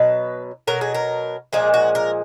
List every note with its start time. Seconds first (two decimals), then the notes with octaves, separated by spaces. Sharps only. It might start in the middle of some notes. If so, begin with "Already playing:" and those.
Already playing: B2 F#3 B4
0.67 B2 F#3 A#4
0.81 G#4
0.94 A#4
1.53 A#2 F3 G#3 G#4
1.74 F#4
1.95 A#4